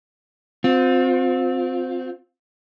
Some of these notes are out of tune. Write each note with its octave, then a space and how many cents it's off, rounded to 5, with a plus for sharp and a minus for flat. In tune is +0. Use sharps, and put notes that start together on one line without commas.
C4 -10 F4 +35